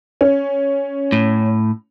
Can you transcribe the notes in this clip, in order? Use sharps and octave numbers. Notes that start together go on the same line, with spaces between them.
C#4
A2